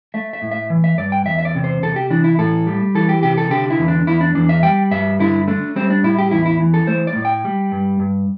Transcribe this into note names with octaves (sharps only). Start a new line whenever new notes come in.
A3 E5
E5
A2
E5
E3
E5
G2 D5
G5
E2 E5
E5
D5
C3
C5
C3 A4
G4
E3 D4
E4
A2 A4
G3
E3 A4
G4
C3 G4
A4
D3 G4
E4
E2
D4
E2 E4
D4
E2 D4
E5
G3 G5
G2 E5
D3 E4
A3 D4
G3 C4
D4
A2 E4
G4
E2 E4
E4
E3
A4
A3 C5
D5
A2
G5
G3
G2
G2